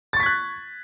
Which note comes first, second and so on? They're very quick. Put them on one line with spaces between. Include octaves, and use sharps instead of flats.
A6 C#6 B6 G#6 F#6